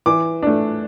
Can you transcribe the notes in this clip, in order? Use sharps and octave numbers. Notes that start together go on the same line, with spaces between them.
E3 D6
A3 D4